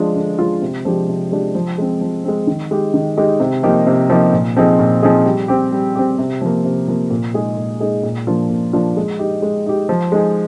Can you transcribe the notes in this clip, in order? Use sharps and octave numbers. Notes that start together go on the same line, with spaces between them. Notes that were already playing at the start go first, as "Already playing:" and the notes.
Already playing: D3 F3 G#3 D4 F4
D3
F3 G#3 D4 F4
C3
F3 G#3 D4 G4
C3
F3 G#3 D4 G4
F3
G#3 C4
F3
G#3 C4
D#3
G#3 D#4 G4
D#3
G#3 D#4 G4
C3
F3 A#3 D#4 G4
C3
F3 A#3 D#4 G4
A#2
F3 C4 D#4 G#4
A#2
F3 C4 D#4 G#4
G3
C4 G4
G3
C4 G4
C3
F3 A#3
C3
F3 A#3
A#2
G#3 D#4 G#4
A#2
G#3 D#4 G#4
A#2
F3 A#3 D4 F4
A#2
F3 A#3 D4 F4
G#3
D#4 G4
G#3
D#4 G4
F3
G#3 D#4 G#4